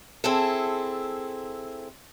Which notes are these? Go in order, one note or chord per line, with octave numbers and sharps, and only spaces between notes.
C4 E4 G#4 A4